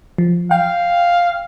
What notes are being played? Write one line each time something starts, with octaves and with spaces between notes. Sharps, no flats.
F3
F5 G5